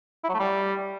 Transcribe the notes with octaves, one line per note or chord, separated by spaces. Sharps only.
E4
F#3
A3
G3